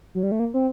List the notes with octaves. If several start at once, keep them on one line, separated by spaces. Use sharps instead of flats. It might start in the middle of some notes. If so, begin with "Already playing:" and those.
F#3
G3
A3
A#3
C4